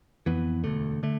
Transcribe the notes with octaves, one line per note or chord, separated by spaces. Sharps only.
F2 E3 B3
E1 D2 D3 A3
D3 A3